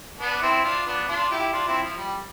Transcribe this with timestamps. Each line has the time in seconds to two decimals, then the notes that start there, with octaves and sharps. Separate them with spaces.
0.19 B3 D4
0.42 C4 E4
0.64 D4 F4
0.86 B3 D4
1.08 D4 F4
1.31 E4 G4
1.52 D4 F4
1.67 C4 E4
1.83 F3
1.97 G3